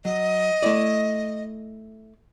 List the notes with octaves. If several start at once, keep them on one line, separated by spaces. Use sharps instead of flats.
F#3 D#5
A3 E4 D5